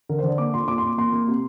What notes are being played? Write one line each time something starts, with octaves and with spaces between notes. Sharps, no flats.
D3 A#4
C5
D3
D5
A#3 D6
A#2 C6
A#2 D6
C6
A#2
A#3 C6
A#3
C3